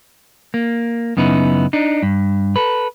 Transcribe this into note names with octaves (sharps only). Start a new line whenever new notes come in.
A#3
F#2 C#3 B3 D#4 E4
D4 D#4
G2
A4 B4